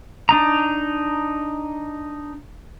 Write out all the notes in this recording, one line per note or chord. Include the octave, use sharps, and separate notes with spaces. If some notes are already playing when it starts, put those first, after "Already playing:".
D4 D#4 A#5